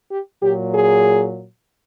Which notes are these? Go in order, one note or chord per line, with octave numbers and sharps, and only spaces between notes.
G4
A#2 F#3 G4
G#4